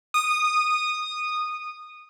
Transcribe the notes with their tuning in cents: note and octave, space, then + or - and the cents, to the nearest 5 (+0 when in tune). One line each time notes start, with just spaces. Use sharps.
D#6 -15